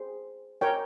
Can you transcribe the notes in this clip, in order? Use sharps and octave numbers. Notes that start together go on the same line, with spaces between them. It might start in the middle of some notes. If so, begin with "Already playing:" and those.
Already playing: G#4 C5
A#4 C#5 G5